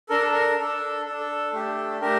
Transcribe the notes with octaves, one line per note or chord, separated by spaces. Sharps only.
D4 A4 A#4
A4
A#4
D4 A4
D4 A4
A4
A3 D4 G4
A3 D4 G4 A#4